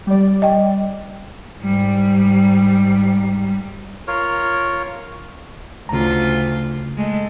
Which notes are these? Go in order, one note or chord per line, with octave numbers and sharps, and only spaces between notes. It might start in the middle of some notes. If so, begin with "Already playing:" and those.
G3 D5
D#5 G5
G#2 G3
F4 A#4 C#5
D2 C#3 F4 A#5
G#3 A3